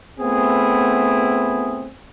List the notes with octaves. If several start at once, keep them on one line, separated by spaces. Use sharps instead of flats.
A3 B3 C4 E4 G#4